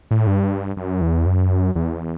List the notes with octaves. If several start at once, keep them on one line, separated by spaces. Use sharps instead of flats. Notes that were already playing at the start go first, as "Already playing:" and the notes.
A2
G2
F#2
E2
F#2
E2